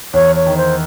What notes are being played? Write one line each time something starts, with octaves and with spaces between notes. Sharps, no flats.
E2 C#5
C#5
D#3
C5